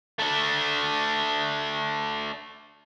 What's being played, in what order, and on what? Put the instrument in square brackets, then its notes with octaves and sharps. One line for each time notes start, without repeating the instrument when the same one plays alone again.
[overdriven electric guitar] A3 D4